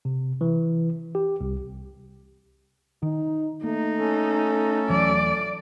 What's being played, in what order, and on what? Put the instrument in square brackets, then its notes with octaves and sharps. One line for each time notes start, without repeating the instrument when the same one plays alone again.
[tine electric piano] C3
E3
G4
C2
[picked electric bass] D#3 [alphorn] D#4
[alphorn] A3 [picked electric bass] A#3 [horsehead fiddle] D#4
[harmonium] C#4 A4
[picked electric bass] D#1 E3 F#3 [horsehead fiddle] D5